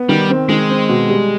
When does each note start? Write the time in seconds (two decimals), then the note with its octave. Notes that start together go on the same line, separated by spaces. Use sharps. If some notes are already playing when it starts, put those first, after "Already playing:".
Already playing: B3
0.09 D#3 G3
0.30 C4
0.49 D#3 G#3
0.69 C4
0.89 B2
1.09 G3